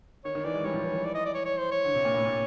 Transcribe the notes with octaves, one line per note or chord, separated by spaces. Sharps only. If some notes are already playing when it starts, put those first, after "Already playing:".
D#3 C#5
D#3
E3 D5
G#3
G3 C#5
F3
E3
E3
D5
D#5
D5
C#5
C#5
C5
C#5
D3
C3
A#2
A2
A#2